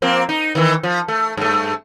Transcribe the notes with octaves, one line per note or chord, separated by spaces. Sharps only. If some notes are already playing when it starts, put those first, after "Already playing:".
F3 A#3 C4
D#4
D#3 E3
F3
A3
G2 A3